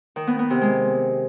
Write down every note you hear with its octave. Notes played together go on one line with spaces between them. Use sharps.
D#3
B3
B3
C3
G#3